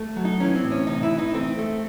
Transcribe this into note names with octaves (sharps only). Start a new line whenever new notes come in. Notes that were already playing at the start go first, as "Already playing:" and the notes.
Already playing: A3
F#3
D#4
E3 C#4
C4
A2
C#4
C3 D#4
E4
E3
D#4
A3 C4
A3